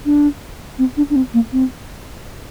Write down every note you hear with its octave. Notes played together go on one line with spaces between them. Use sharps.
D4
C4
D4
D4
C4
A#3
C4